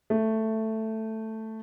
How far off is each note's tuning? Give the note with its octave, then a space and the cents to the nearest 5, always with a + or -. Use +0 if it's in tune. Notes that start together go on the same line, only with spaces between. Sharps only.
A3 +5